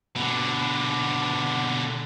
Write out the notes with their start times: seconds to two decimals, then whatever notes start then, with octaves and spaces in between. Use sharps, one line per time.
0.16 B2 D3